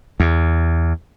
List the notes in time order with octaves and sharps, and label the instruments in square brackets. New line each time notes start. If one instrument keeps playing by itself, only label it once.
[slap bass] E2